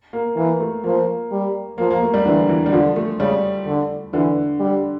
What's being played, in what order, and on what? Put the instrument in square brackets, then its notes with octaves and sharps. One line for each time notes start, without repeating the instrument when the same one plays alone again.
[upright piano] A#3
[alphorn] E3 [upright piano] A#3
[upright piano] A3
[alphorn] F3 [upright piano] A#3
[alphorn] G3
[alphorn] F3 [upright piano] A#3
[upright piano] A#3
A3
G3
[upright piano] D3 [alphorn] E3
[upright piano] E3
G3
[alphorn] D3 [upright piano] F3
[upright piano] A3
[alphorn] C#3 [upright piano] G3
[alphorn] D3
[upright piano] D3 [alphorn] E3
[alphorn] G3